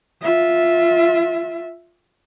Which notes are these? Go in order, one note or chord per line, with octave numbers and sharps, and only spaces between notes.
F4 E5